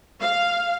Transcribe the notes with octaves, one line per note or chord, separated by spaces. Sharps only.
F5